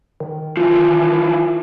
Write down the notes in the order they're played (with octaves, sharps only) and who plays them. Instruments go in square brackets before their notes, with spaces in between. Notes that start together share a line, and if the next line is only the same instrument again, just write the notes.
[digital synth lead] D#3
[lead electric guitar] E3 F3 [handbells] F4